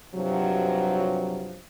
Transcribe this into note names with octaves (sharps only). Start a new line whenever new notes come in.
G2 C3 F3 F#3